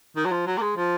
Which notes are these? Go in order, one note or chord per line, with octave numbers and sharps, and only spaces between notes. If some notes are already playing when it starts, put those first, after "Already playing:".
D#3
F#3
F3
F#3
A#3
G#3
F3